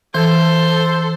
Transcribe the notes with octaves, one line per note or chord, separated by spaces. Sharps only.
E3 A4 C5